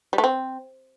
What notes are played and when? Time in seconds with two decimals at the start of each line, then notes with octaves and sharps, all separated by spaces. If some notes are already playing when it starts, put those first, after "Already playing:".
0.13 G3
0.18 A3
0.24 C4